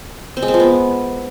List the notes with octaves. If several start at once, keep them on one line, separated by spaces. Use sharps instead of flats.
C4
G#3
C4
F3
B3